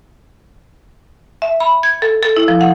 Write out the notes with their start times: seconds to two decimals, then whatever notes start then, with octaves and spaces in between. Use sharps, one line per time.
1.42 E5
1.60 B5
1.83 G#6
2.02 A4
2.22 A4
2.36 E4
2.48 F3
2.61 F#5